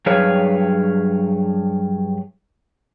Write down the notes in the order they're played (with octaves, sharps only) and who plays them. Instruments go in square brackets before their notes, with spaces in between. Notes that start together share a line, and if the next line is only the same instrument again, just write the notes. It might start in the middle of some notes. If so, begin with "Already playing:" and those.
[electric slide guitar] G2 F#3 G#4 B4 C#5 F5